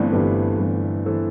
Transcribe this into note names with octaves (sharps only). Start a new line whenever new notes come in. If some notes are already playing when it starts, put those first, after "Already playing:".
Already playing: G1 G2 E3 A3 B3 C4 D4
G1 G2 E3 G4 B4
G1 G2 E3
E3 A4 C5